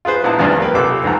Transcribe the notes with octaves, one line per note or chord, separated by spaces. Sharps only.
F4 G#4 B4 C5
A#1 B3 E4 A5 A#5 D#6
E2 G2 E3 F3 B3 C4
A#3 B4 G5
B1 C3 F4 A4 D6 E6
B1 G#2 F3 A#5